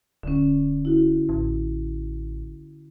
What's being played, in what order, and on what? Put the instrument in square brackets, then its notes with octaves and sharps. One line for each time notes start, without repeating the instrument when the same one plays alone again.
[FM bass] D1 [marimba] D3 C#4
[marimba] E4 F#4
[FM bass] A1